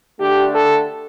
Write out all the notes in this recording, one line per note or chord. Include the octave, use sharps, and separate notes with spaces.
D3 A3 D4 G4
A4